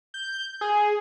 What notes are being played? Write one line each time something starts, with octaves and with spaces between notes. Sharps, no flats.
G6
G#4